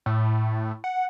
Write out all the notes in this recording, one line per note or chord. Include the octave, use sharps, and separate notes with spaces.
A2
F#5